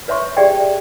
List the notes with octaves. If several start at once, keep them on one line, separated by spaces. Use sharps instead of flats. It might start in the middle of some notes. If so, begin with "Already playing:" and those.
B4 C#5 E5 C6 C#6
G4 G#4 D5 E5 G5